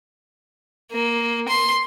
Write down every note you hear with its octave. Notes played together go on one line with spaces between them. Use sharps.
A#3
C6